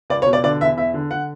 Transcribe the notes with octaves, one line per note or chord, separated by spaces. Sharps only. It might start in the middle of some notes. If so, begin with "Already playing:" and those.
C#2 D5
C#5
B2
D5
D3 D5
E2 E5
E2 E5
D3
D3 F#5